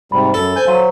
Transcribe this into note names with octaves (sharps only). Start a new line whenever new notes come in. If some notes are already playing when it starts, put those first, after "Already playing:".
G#2 C3 G3 B5
F#2 A4
C5 G#5 G6
F#3 F5 C6 D#7